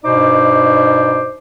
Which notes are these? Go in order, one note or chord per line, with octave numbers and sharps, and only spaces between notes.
G2 B2 D#4 C5 D5 D6